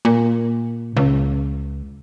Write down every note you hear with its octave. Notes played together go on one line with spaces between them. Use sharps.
A#2
C#2